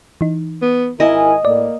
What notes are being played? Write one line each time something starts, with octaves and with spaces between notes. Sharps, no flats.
E3 D#4
B3
G#1 E4 A#4 D#5 G#5
A2 A#3 D5